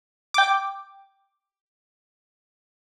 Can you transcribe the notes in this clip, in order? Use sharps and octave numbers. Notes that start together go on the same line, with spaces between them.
G5 D6